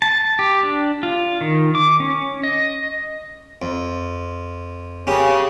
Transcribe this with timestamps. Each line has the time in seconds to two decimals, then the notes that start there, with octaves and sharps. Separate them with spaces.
0.02 A5
0.39 G4
0.63 D4
1.03 F4
1.41 D#3
1.75 D6
2.00 C#4
2.43 D#5
3.62 F2
5.07 C#3 C#4 G4 A#4